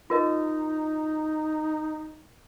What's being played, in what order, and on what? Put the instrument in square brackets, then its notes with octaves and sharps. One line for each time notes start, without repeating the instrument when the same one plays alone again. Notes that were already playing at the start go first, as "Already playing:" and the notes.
[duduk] D#4 [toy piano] F4 A#4 D#5